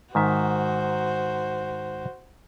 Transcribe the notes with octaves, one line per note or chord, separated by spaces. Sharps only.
G#2 D#3 F#4 C5 E5